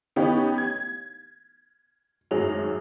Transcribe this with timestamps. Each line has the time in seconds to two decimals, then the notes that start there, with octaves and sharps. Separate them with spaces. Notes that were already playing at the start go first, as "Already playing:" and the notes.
0.16 D#3 B3 C#4 D#4 G4
0.58 G#6
2.31 G#1 F#2 F#3 G#4 F7